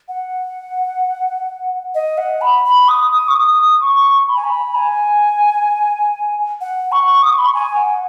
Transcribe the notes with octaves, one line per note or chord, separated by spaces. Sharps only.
F#5
D#5
F#5
B5
B5
D#6
D#6
C#6
D#6
C#6
B5
G#5
B5
G#5
F#5
C#6
D#6
C#6
B5
C#6
G#5
F#5